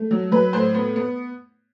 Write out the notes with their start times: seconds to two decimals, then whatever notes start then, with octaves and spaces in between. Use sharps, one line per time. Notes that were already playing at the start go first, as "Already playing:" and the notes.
Already playing: A3
0.11 F#3
0.31 F#3 B4
0.53 A2 C5
0.75 B3
0.96 B3